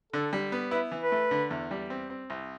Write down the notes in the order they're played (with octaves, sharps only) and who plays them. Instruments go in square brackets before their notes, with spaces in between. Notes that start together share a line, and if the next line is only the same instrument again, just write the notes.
[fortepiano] D3 [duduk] A4
[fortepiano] G3
B3
[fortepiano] E4 [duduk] B4
[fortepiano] E3
[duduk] B4
[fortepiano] A3
D3
E2
G3
C4
C4
C2